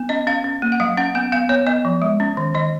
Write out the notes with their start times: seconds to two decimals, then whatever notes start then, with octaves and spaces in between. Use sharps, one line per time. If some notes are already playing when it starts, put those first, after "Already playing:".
Already playing: B3
0.09 C#4 D#5
0.27 C#4 F5
0.44 C#4
0.62 A#3
0.72 F#5
0.80 F#3 F5
0.97 C#4 F#5
1.15 B3 F#5
1.32 B3 F5
1.49 B3 C#5
1.67 B3 D#5
1.85 F3
2.02 G#3
2.20 C#4
2.37 D#3
2.54 D#3 D#5